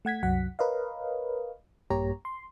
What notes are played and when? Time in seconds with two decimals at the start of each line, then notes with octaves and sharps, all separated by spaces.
0.05 A3 F#5 G#6 B6
0.23 C2 F#2 F#3 F#5 B6
0.59 A#4 B4 C#5 D#5 F5
1.90 A#1 G2 A#3 G4 C#5 A#5
2.25 C6